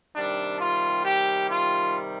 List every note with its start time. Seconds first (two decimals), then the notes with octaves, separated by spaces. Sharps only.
0.16 C3 D#3 G3 D4
0.61 F4
1.05 G4
1.50 F4